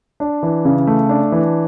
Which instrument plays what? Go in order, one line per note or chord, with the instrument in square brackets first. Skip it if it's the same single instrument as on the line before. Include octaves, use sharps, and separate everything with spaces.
[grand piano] D4
E3
C#3
A3
D4
E3